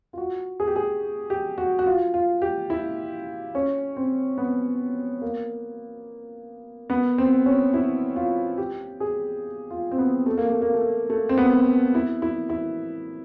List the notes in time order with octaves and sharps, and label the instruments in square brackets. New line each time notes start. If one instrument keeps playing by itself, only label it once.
[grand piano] F4
F#4
G#4
G4
G#4
G4
F#4
F#4
F4
F4
G4
E4
C#4
C4
B3
A#3
B3
C4
C#4
E4
F4
G4
G#4
F4
C4
B3
A3
A#3
A3
A#3
A3
A3
C4
B3
E4
E4
E4